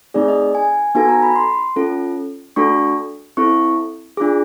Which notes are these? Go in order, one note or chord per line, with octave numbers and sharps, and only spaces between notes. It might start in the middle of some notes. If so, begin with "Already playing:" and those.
A3 C4 D#4 G#4 D5
D#5
G#5
B3 D#4 F#4 A4 G#5
A#5
B5
C6
C#4 F4 A4
A3 D4 F#4 A4 C#6
C4 E4 A4 C#6
D4 F4 G#4 D6